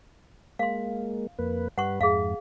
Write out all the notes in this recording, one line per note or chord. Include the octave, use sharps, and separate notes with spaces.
G#3 A#3 F5 C6
F2 A#3 B4
G2 G3 B4 F#5 C#6
F2 G#2 G#4 E5 F5